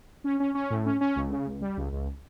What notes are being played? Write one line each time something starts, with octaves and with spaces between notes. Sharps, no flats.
C#4
C#4
C#4
A2
C#4
C#4
C#2
C#3
C#2
G3
C#2
C#2